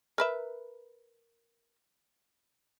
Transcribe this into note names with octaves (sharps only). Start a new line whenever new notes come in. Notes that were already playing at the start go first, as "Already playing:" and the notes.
A#4 B4 E5